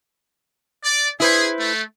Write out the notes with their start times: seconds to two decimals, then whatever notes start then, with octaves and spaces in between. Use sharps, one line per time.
0.83 D5
1.20 E4 G#4 B4 C5
1.60 A3